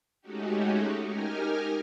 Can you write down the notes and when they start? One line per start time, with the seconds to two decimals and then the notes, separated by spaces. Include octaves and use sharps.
0.21 G#3 A3 C#4 D#4 F#4 G4
1.07 D#4 G4 A#4 G#5 F6